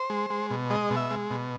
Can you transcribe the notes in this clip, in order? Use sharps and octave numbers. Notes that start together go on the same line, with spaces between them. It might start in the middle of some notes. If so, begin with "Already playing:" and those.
Already playing: C5
G#3
G#3
B2
G#3 D#5
B2
E5
G#3
B2